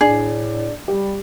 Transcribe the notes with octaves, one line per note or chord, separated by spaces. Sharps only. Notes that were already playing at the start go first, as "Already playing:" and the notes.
A2 D4 G#4
G3 G4